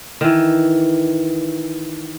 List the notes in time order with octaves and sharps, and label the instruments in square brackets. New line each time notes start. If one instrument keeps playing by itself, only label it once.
[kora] D#3 E3